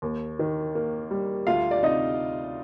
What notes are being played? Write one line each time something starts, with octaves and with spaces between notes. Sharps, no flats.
D#2
D#3
A#3
G3
D2 F4 F5
D5
C3 D#4 D#5